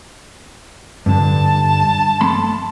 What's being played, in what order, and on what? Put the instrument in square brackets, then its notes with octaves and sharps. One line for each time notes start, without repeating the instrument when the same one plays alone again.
[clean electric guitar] G2 D3 [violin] A5
[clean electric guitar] A3 B5 C6